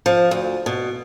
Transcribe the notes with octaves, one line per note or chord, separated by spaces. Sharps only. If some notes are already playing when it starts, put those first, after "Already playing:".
F3
D2
B2